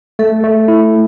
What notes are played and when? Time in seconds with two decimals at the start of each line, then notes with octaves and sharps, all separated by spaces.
0.19 A3 A4
0.43 A3
0.68 E4